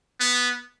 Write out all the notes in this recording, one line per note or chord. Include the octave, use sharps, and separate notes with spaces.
B3